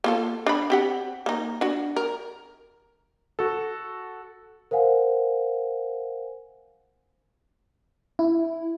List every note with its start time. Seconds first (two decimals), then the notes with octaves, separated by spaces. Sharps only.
0.04 A#3 F4 A4
0.46 D4 B5
0.70 C4 G4 F#5
1.26 A#3 D#4
1.61 D4 F#4
1.96 A#4
3.39 F#4 A4
4.71 A#4 C5 F5 F#5 G#5
8.19 E4